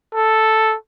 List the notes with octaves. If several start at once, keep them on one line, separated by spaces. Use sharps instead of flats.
A4